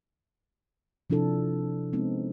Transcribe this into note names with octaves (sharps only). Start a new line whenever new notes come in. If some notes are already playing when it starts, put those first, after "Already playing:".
C3 F3 D4 E4 A4
G#3 B3 C4 D#4